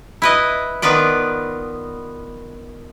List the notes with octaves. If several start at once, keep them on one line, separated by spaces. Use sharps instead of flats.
E4 B4 D#5
D#3 B3 F4 B4 D5